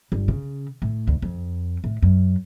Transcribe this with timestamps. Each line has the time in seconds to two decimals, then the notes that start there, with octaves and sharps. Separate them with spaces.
0.12 G1
0.28 C#3
0.82 A2
1.07 D2
1.22 F2
1.84 A2
2.02 F#2